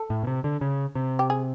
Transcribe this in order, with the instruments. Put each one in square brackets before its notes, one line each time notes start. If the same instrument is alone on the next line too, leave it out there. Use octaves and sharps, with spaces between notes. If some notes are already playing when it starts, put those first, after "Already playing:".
Already playing: [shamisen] A4
[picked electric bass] A2
B2
C3
D3
C#3
C3
[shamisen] G4
G#4